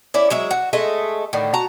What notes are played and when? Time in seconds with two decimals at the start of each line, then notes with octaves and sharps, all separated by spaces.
0.14 C#4 E4 D5
0.30 F#3 G#3 E5
0.51 F#4
0.73 G#3 A3 A4 D#5
1.33 A2 D3 D#3
1.54 F#4 A5 A#5